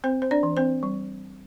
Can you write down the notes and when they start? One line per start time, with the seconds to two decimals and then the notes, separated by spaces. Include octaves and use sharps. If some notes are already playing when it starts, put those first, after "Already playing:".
0.04 C4 C5
0.22 C5
0.31 D4 D5
0.43 E3
0.57 C4 C5
0.83 G3